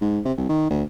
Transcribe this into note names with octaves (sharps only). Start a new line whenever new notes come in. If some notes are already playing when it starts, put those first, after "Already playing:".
G#2
C3
C2
D#3
D2